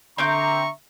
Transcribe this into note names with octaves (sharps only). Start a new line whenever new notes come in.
D3 C4 E5 A#5 C#6 D6 G6